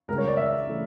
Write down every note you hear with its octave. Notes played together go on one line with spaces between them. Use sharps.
C#2 C#3 G3 A#4
C#5
D5
E5
C#3 E3 A3